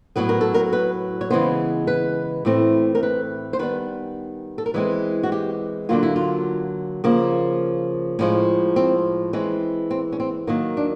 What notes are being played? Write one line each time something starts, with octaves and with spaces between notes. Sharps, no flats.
A2 F#3 B3 B4
A#4
A4
A#4
B4
C#5
C#3 E3 G#3 B3 C5
B4
A2 E3 A3 C4
A#4
B4
C5
D#3 G3 B3 B4
A4
A#4
E3 G#3 C4 B4
F#4
G4
D3 F#3 A#3 F4
E4
F4
C#3 F3 A#3
A2 F3 G#3 C#4
C4
E3 G#3 C4 C#4
C4
C#4
C4
D#3 F#3 A#3 C#4
D4